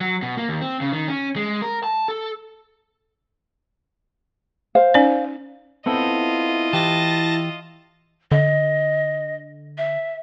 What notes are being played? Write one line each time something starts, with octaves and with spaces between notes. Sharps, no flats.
F#3
B2
A#3
D#2
C4
C#3
D#3
C#4
G#3
A#4
A5
A4
C5 F5
C#4 D#4 D5
B3 C4 E4 F4 A4 D#5
E3 G4 A5 A6 A#6
D3 D#5
E5